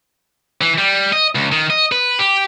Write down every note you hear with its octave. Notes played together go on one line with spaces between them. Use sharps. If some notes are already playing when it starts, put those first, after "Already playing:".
E3
G3
D#5
C#2
D#3
D#5
B4
G4